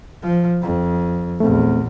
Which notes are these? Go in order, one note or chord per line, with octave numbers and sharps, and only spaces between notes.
F3
F2
A#1 E2 A3 C4